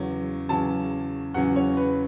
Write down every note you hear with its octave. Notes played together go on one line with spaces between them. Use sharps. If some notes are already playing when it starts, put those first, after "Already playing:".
Already playing: E2 C#3 F#3 C#4
E2 C#3 F#3 C#4 A5
E2 C#3 F#3 C#4 F#5
C#5
B4